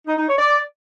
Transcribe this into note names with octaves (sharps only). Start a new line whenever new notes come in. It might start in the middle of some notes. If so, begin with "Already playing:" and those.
D#4
D#4
C#5
D5